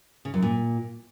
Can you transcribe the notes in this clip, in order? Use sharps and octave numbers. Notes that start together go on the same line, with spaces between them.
C#3
F#2
A#2